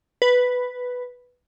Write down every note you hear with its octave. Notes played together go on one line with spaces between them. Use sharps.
B4